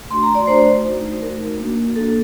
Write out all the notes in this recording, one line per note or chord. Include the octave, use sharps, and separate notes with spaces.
A3 D4 F#4 C6
A#5
D5
A3 D4 F#4 C5
A3 D#4 F#4
A3 D#4 F#4 A#4
A#3 D4 F#4
A#3 D4 F#4 A4